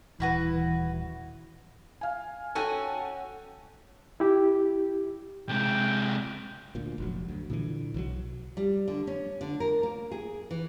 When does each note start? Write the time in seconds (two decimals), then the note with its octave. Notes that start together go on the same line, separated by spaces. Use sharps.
0.20 D#1 E3 E4 F#4 B4
2.01 F5 G#5
2.55 C#4 F#4 A4 G5 G#5 D#7
4.20 E4 G4
5.49 C3 G#3 G5
6.75 D2 A#2
6.98 F1 A#1 F#3
7.25 D2 F#3
7.50 A#2 D3 E3
7.94 B1 D#3 F#3
8.57 G3
8.88 D3
9.07 C#4
9.41 D3
9.60 A#4
9.83 A#3
10.12 G#4
10.51 E3